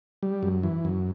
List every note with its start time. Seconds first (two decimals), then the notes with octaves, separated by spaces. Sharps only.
0.23 G3
0.43 F#2
0.63 E3
0.85 F#2